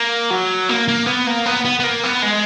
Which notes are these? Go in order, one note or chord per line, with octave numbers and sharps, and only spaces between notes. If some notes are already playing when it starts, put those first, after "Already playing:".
Already playing: A#3
F#3
A#3
A#3
B3
A#3
B3
B3
B3
A#3
B3
G#3